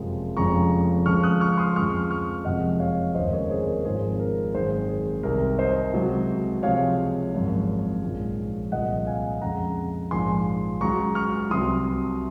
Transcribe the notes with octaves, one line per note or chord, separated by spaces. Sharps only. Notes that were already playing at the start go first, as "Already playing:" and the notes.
Already playing: F#1 F2 C3 F3 G#3
F1 F2 C#3 F3 G#3 A#5 C#6
C#2 C#3 F3 G#3 C#6 F6
D#6 F#6
C#6 F6
C6 D#6
F2 C#3 F3 G#3 C#6 F6
C#6 F6
F#1 F2 C3 F3 G#3 D#5 F#5
C#5 F5
F1 D#2 C#3 G#3 C5 D#5
A#4 C#5
G#4 C5
A#4 C#5
G#1 G#2 F3 G#3 G#4 C5
A#4
G#1 F#2 D#3 G#4 C5
G#4
C2 C3 D#3 A#4
C5 D#5
C#2 C3 F#3
C#2 C3 F3 G#3 C#5 F5
G#1 F#2 F3 G#3
A#1 G#2 F3 G#3
C2 A#2 F3 G#3 D#5 F#5
F5 G#5
F2 C#3 G#3 F#5 A#5
A#1 G#2 F3 G#3 G#5 C6
C#2 C#3 F#3 A#5 C#6
C#6 F6
C2 C3 F#3 C6 D#6